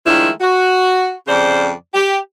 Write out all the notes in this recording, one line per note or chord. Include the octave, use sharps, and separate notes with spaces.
D#3 F3 G#3 A3 D4 E4
F#4
F2 C#3 C5 D5
G4